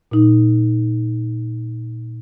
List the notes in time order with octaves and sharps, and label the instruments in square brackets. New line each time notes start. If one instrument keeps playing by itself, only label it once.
[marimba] A#2 D#4